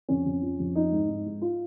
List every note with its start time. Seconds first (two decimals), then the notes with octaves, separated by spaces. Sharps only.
0.09 F2 C#4
0.26 F2
0.42 F3
0.60 F2
0.75 F3 D#4
0.92 G#2
1.08 G#2
1.26 G#2
1.42 F4